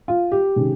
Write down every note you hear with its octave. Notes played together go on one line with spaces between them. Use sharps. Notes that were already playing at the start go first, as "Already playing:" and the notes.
F4
G4
C3 D#3 G#3 C#4